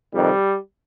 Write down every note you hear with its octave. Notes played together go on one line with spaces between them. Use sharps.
F2 C3 D#3 G3